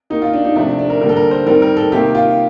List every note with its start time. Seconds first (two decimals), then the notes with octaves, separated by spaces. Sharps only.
0.10 D#3 A#3 D#4
0.22 F4
0.34 D4
0.45 D#4
0.56 C3 F3 A3 D4
0.79 D4
0.90 A#4
1.01 D3 G3 A#3 A#4
1.09 A4
1.16 A#4
1.31 C5
1.46 D#3 G3 C4 A#4
1.62 A#4
1.77 A4
1.92 C3 D#3 A#3 G4
2.15 F4